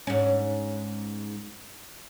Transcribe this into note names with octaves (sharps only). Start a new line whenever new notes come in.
G#2 C#4